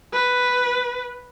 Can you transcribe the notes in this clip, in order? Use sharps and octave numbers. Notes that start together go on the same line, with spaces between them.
B4